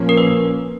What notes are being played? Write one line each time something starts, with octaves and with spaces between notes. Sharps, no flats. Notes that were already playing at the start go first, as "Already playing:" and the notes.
Already playing: A#2 F3 A#3 C#4
A#4
B4